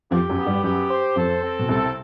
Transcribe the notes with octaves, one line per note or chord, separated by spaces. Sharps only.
F2 F3 G4
F#2 F#3
B3
G2 G3
F#2 F#3 G4
C5
F2 F3 A4
C4
B2
C2 C3 A4